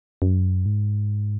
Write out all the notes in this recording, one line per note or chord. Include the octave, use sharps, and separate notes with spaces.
F#2
G#2